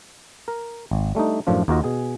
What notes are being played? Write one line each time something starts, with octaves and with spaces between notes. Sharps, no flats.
A#4
G#1
G3 A3 D4 D#4
F#2 A2 F3 D4 F4
D#2 A#3 F4 F#4 A#4 D#5
B2 G#4 G#5